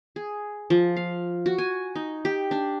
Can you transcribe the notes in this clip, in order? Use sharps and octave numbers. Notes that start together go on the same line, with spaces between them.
G#4
F3
F5
F#4
G#5
D#4
G4
D4